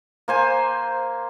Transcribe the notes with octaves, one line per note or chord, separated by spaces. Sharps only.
A#3 C5 G#5